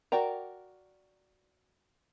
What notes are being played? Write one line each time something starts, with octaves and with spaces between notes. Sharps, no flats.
F#4 A#4 D5 G5 A#5